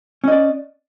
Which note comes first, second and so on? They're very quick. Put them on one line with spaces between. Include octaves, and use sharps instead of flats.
C#4 D#5 D5